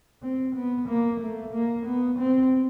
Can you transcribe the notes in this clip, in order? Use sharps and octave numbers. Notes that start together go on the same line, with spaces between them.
C4
B3
A#3
A3
A#3
B3
C4